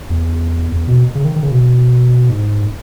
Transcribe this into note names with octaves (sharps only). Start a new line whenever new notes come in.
E2
E2
B2
C#3
D#3
D#3
C#3
B2
G#2